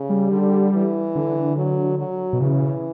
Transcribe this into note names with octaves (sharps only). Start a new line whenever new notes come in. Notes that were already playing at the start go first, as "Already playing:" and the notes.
Already playing: C#3
G3
D3
E3
D3
F#3
F#3
B2
C#3 E3